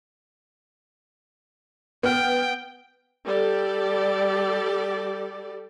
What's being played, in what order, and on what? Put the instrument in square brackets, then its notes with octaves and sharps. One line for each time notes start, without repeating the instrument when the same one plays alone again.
[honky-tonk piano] B3 F6 [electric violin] G5
[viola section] G3 G4 A4 D5